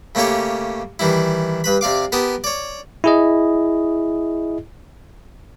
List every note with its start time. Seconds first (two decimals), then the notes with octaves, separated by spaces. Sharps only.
0.15 C#3 A3 A#3 C#4 G4 C#5
0.99 D#3 E3 G3 E4
1.64 G2 B4 B5
1.81 C3 D5 F5 D6
2.12 B3 G4 A#4 A5 D#6
2.44 C#5 D5
3.04 E4 G#4 D#5